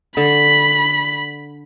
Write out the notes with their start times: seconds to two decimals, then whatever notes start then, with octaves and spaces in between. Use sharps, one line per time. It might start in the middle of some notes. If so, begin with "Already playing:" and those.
0.17 D3 B5